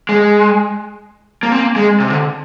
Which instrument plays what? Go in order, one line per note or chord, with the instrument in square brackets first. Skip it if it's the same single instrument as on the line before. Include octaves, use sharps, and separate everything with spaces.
[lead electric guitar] G#3
A#3
C4
A#3
G#3
C3
D3